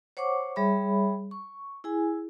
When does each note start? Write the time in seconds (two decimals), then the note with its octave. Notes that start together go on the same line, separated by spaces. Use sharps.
0.17 C5 C#5 F#5 C#6 D6
0.56 G3 G#4 C#5 E5 B5
1.31 C#6
1.84 E4 G#4 G#5